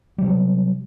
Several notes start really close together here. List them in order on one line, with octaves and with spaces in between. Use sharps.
G3 C3 F#3